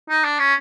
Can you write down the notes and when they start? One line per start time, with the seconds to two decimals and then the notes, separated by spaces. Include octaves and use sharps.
0.10 D#4
0.25 D4
0.39 C#4